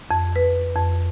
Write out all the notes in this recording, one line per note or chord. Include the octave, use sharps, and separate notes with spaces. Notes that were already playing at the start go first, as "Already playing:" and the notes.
F2
B4
F2